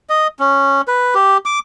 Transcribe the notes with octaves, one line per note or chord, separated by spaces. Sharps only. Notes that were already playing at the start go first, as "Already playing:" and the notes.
D#5
C#4
B4
G4
D6